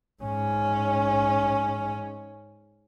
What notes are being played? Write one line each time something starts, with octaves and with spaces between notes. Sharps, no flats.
G#2 C#4